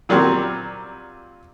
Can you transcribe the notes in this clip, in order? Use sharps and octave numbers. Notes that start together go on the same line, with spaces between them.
A#2 F#3 G3 A#3 C4